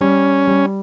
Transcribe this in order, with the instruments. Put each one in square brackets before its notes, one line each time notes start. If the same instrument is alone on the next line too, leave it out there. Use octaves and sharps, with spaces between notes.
[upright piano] G3 [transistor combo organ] C#4
[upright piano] G3